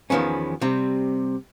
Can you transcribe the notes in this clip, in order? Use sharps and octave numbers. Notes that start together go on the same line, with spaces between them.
E2 D#3 F3 B3 C#4
C3 G3 C4